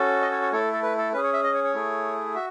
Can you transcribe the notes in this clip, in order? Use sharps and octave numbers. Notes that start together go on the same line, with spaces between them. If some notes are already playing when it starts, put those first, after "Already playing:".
Already playing: C#4 F#4 A4
D#5
C#5
C#5
A3 E4 A4 C#5
A4
B4
A4
C#4 G#4 B4
C#5
E5
D#5
C#5
C#5
A3 E4 G#4
F#4 E5